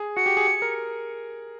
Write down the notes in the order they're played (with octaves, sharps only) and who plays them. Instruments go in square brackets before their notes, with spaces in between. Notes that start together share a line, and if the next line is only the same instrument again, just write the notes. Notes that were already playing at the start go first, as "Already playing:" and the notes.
Already playing: [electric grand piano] G#4
[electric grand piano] F#4 [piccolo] C#7
[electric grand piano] G4
G#4
G#4
A#4